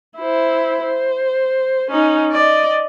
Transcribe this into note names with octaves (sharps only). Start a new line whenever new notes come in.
E4 C5
C5
C#4 D#4
D5 D#5